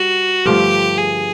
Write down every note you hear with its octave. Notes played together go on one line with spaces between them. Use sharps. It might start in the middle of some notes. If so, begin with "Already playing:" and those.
Already playing: G3 F#4
G2 D3 F3 A3 G4
G#4